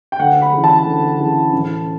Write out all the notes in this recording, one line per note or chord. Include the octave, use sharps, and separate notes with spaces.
G5
D2 F#5
B5
C#3 E3
A5
D2
C#3 E3
A1